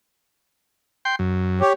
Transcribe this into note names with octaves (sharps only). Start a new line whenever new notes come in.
G5 C6
F#2
G4 C#5